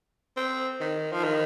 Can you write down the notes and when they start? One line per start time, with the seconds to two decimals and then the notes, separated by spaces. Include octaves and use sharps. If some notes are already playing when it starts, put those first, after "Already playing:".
0.37 C4
0.81 D#3
1.12 F3
1.24 D#3